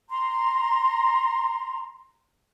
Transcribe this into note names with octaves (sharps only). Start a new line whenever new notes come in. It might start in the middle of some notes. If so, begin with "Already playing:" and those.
A#5 C6